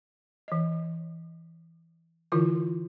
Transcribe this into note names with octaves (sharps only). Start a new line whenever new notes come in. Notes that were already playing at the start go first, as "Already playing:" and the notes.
E3 D#5
D3 E3 E4 F4 A#4